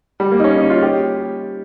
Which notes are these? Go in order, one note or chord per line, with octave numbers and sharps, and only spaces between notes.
G3
A#3
D#4
C#4
D#4
F4
G4